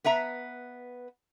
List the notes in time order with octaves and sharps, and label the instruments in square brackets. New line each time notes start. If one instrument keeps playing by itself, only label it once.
[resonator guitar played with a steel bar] B3 B4 E5 A#5